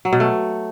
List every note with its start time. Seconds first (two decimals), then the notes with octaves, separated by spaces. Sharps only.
0.05 F#3
0.13 B2
0.20 A3